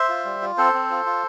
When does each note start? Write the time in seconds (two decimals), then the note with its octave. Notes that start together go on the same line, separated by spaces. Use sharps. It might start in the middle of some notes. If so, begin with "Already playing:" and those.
Already playing: C5 E5
0.09 F4
0.25 G3
0.42 F4
0.57 C4 A4 C5
0.74 C4
0.90 F4
1.06 F4